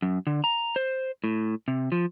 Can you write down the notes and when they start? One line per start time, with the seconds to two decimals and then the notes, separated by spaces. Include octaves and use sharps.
0.02 F#2
0.27 D3
0.44 A#5
0.76 C5
1.24 A2
1.68 C3
1.92 F3